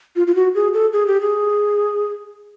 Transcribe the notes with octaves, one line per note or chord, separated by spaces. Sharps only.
F4
F4
F#4
G#4
A4
G#4
G4
G#4